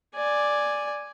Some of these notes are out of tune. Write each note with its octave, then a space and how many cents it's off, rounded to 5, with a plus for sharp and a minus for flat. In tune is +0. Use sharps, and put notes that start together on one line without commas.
D5 +0 G#5 +0